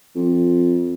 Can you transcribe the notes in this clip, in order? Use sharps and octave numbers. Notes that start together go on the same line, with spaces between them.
F2